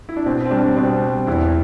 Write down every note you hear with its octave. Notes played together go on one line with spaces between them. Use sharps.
E4
D4
B2 C4
C4
G3 D4
B2 C4
G3
E2 E4